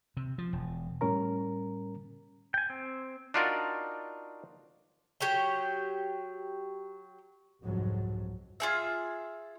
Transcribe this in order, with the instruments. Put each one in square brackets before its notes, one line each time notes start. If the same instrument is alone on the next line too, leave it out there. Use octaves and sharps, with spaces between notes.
[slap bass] C3
F3
E1
[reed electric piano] A2 G3 C#4 A#4 A#5
[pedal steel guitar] G5 G#5
C4
[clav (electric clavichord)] D4 D#4 F4 F#4 A#4 D5
[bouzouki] F#3 G4 C#5 G5
[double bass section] C2 F2 G#2 F#3
[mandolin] F4 G#4 E5